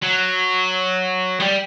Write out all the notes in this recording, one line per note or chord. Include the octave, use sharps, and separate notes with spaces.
F#3
G3